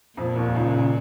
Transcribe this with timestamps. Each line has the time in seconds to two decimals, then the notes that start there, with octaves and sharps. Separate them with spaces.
0.17 F2 A#2 F3
0.36 D#2 D#3
0.55 C#2 C#3
0.73 C#2 C#3